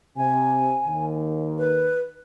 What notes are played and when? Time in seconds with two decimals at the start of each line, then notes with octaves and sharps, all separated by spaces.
0.17 C3 G#5
0.87 D#2 D#3
1.58 B4